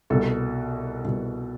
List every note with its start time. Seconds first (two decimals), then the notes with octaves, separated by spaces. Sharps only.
0.10 C2 B2 A4
1.05 C2 B2